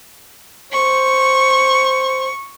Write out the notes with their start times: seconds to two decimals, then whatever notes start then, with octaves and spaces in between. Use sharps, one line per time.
0.73 C5 C#6